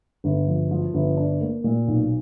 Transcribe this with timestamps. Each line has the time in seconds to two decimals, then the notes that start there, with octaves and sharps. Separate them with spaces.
0.24 G1
0.47 F3
0.71 F3
0.94 G1
1.17 D4
1.41 A#3
1.64 A#2
1.88 B1